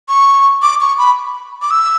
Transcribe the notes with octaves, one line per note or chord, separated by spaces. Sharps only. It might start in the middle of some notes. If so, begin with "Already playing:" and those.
C#6
D6
C#6
B5
D6
E6